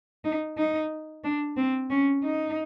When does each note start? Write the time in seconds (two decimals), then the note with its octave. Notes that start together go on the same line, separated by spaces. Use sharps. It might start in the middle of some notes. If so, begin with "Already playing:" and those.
0.24 D#4
0.57 D#4
1.24 D4
1.57 C4
1.90 C#4
2.24 D#4